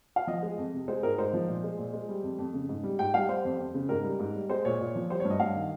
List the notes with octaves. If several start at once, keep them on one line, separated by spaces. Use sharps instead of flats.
F5
F3 D#5
G#3
F2
C3
G#3 C5
G#2 A#4
G#2 C5
F3
A#2
G#3
A#2
G#3
G3
F2
F2
C#3
G#2
G3
G#2 G5
G3 F5
G3 C5
F2
F2
C#3
G#2 A#4
G3
G#2
G3
G#3 C5
A#2 C#5
A#2
F3
G3 C5
G2 C#5
D#5
G2 F5
D#3